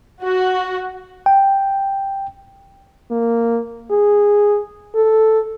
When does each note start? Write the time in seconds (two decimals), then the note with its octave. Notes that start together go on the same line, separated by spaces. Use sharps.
0.23 F#4
1.26 G5
3.11 A#3
3.91 G#4
4.95 A4